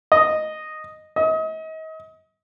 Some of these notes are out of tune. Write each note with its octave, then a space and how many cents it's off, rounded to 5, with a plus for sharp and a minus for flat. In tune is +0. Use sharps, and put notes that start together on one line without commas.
D#5 -5
D#5 +35